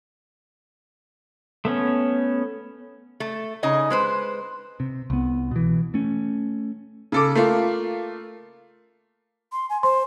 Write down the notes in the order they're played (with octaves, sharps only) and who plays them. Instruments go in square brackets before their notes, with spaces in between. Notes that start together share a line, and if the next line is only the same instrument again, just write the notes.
[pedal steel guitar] A3 B3 C#4
[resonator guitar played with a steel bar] A3
C#3 D#4 D#5 G#5
G#3 B4 C5
[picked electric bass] C3
C2 B3
B2 E3
A3 C#4
[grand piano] C#3 A4 D6
A3 A#3 F4
[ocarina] C6
G#5
[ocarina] C5 [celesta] C6